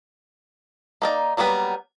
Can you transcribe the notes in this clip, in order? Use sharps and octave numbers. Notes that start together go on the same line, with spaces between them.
A#3 D#4 D5
F#3 G3 A#3 B3 B4